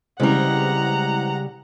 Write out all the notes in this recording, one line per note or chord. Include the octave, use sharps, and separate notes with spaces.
C#3 E3 G3 G#3 C4 F#5 A#5